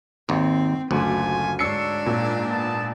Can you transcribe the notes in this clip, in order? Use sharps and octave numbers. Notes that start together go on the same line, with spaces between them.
G#1 D#2 C4
F#1 D2 A3 F4 G#5
G#2 D4 C#5 E6 C7 C#7
A#2
B3 A5